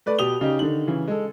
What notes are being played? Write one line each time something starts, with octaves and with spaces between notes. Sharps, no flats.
A3 B4 D5
B2 G4 D#6 F7 G7
C#3 D#4 G4
D3 D#3 F#7
C#3 E3
G#3 A4